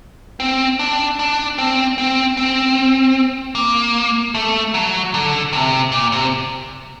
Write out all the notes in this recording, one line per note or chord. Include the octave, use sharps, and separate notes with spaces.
C4
D4
D4
C4
C4
C4
A#3
A3
F#3
D3
C3
A#2
C3